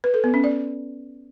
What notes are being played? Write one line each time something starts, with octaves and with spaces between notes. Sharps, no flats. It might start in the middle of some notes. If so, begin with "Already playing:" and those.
B4
A4
B3
C#4
D5